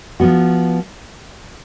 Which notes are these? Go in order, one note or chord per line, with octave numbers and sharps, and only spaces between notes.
F3 B3 F#4